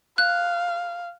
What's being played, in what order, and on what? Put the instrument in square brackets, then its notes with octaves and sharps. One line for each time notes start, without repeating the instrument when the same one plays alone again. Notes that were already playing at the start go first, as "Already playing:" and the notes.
[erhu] F5 [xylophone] F#6